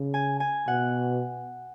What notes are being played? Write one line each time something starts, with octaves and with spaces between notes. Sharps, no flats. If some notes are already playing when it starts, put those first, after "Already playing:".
Already playing: C#3
G#5
G#5
B2 F#5